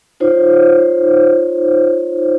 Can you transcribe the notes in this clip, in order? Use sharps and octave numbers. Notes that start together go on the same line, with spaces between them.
D#4 F4 C5 C#5